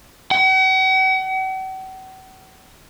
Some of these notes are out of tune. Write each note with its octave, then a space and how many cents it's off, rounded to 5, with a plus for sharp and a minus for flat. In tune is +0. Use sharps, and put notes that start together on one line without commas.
F#5 +40